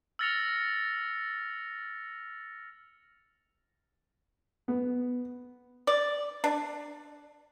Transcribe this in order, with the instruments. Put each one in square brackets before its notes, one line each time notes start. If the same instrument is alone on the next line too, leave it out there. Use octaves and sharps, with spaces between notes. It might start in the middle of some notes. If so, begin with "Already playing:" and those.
[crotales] E6 F6 A6 A#6 C#7 F7
[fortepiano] B3
[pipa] D5
D4